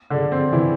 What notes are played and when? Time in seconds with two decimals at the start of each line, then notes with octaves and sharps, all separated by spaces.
0.10 D3 D4
0.32 C4
0.53 E3 E4